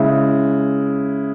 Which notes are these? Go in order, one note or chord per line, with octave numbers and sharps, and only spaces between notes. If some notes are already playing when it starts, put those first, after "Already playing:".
Already playing: C#3 G#3 E4